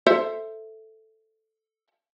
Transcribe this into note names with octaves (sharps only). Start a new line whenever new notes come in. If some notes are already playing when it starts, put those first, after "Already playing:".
A4 C5 E5